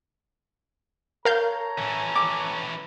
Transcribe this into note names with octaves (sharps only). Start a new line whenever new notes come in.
A4 A#4 C#5 F5 A#5 G6
E3 C#4
D6